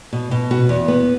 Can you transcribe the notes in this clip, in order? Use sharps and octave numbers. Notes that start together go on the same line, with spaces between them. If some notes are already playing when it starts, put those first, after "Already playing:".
B2
B2
B3 F#4
E2
B3